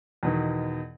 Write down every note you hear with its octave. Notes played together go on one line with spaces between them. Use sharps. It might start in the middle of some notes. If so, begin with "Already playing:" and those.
E2 B2 D#3